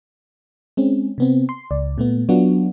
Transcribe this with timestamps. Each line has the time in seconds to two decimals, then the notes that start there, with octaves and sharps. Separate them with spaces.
0.77 G#3 C4 C#4
1.18 C3 B3 C4
1.49 C6
1.71 C#2 D5
1.98 A#2 A3 B3
2.29 F#3 B3 D4 F4 F#4